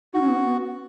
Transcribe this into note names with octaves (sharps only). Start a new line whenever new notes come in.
D#4 F#4
C#4
B3
C#4
B3